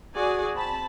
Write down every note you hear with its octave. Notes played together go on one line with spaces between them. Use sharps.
F#4 G#4 D5 G#5
C4 A5 B5